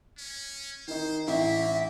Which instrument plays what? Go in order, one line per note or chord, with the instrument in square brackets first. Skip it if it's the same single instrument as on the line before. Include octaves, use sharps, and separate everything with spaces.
[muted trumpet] C#4
[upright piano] D#3 D#4 [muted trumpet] C5
[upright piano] A1 [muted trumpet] A#3 [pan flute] E5